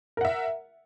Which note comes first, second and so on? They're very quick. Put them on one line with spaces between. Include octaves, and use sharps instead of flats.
A#4 F#5 E5